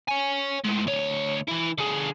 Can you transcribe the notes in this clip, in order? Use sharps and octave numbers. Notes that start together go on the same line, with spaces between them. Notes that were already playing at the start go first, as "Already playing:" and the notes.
C#5 G#5
A2 G#3
D2 C#5
E3 E4
D3 G#4